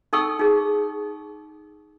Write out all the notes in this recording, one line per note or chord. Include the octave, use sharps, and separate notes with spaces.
D#4 A4 G5 C#6 E6
D#4 G#4